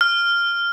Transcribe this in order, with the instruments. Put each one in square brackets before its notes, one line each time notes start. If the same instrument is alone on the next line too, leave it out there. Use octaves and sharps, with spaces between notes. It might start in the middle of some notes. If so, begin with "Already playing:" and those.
[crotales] F6